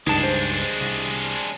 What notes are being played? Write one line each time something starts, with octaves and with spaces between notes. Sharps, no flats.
C#2 G2 G#3 D4 D#4 A5
C5
C2